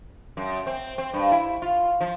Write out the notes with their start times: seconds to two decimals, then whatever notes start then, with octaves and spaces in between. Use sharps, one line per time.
0.37 F#2
0.67 C4
0.98 C4
1.14 G2
1.32 E4
1.62 F4
2.01 F3